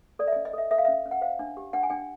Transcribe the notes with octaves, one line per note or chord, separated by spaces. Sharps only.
A4 D5
E5
C#4 D#5
D#5
A4 E5
A4 E5
F5
C#4 E5
C#4
F#5
C5 F5
D4
G4
D4 F#5
G#5
D4 G5